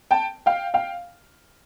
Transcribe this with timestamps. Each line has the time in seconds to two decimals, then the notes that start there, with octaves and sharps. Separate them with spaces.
0.11 G5 A5
0.46 F5 G5
0.74 F5 G5